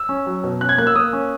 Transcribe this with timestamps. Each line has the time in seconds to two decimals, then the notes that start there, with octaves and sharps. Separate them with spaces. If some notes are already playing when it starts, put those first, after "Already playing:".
Already playing: E6
0.09 C#4
0.26 F#3
0.44 B2
0.61 C#4 F#6
0.69 G#6
0.78 A#3 F#6
0.87 E6
0.95 A#3 D#6
1.13 C#4